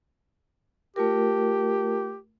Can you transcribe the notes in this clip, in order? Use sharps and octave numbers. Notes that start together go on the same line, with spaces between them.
A3 F4 G4 A#4